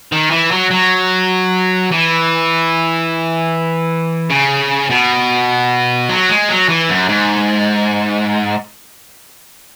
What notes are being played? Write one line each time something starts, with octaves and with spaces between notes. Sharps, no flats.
D#3
E3
F#3
F#3
E3
C#3
B2
F#3
G#3
F#3
E3
F#2
G#2